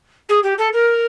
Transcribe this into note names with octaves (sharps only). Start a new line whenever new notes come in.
G#4
G4
A4
A#4